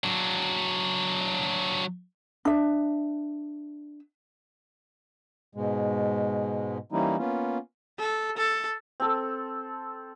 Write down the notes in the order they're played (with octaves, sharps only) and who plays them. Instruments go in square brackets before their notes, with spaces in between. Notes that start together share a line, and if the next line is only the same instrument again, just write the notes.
[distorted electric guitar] F#3 D4
[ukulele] D4 E5
[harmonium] G#2 B2 G#3
E3 G3 A#3 C#4 D#4 E4
A#3 B3 C#4 F4
[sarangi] A4
A4
[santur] C4 A4